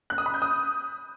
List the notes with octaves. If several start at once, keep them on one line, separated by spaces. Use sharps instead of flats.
F#6
D#6
B5
G6
D#6